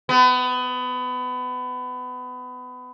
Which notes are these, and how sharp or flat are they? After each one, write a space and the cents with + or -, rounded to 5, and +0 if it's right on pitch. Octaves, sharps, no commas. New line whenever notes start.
B3 +25